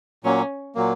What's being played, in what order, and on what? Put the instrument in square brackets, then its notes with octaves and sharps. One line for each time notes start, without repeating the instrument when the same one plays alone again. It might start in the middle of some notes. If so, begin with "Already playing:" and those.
[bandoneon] A#2 F#3 A#3 [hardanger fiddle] C#4
[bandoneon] A#2 F#3 A#3